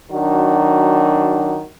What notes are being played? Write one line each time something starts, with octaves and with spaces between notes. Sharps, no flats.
D#3 F#3 D4 F#4